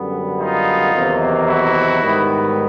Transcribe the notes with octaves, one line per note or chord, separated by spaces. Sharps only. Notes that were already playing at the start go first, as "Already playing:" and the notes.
Already playing: F#2 D3 G3 B3
D#4 F4
E2 C3 D#3 F#3 A#3
E4 F#4
G#2 D#3 G3 B3